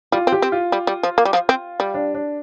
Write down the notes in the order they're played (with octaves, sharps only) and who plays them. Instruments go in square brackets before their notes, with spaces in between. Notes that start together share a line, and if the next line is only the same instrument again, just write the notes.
[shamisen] G3 [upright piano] F4
[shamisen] C4
[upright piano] G4
[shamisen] C4
[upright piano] F4
[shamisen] G3
G3
F3
A#3
G3
F3
C4
G3
[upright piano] D4
D4